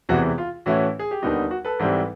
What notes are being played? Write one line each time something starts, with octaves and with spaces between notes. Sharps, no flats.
E2 C3 E3 G#3 F#4
F4
A2 E3 A3 C#4 E4 F#4
G#4
G4
D#2 D3 G3 B3 D#4 F#4
F#4
A4 B4
G#2 E3 G3 C4